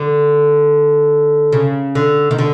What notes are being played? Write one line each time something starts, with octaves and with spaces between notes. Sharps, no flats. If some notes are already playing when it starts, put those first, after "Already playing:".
Already playing: D3
C#3
D3
D#3
D3